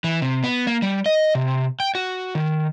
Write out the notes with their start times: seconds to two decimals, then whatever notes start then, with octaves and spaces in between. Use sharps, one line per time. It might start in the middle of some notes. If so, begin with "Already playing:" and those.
0.04 E3
0.22 C3
0.44 B3
0.67 A#3
0.82 G3
1.06 D#5
1.35 C3
1.80 G5
1.95 F#4
2.35 D#3